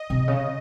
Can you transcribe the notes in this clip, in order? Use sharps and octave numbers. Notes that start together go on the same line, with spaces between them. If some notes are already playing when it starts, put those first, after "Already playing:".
Already playing: D#5
C3
C#3